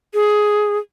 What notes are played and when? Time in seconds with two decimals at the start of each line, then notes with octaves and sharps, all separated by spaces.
0.14 G#4